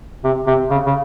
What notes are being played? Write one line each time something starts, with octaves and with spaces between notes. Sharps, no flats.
C3
C3
C#3
C#3